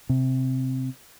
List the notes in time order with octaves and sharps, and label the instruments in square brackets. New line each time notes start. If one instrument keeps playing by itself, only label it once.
[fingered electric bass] C3